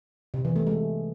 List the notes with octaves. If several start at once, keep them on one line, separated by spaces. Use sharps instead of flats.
C3
E3
A3
G#3